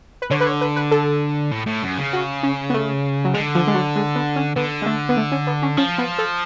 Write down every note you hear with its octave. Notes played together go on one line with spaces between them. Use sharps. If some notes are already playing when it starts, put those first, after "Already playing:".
B4
D3 C#5
B4
C#5
B4
B4
A4
A2
A2
F#2
C#3
F#4
C#4
B3
A3
F#3
D3 G#3
F3
G#3
F#3
G#3
B3
C#4
D3 B3
G#3
A3
B3
A3
C#4
B3
C#4
F3 C#4
B3
A4